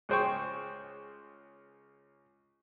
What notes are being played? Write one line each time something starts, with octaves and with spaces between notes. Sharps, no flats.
C#2 G#4 C5 G5 C#6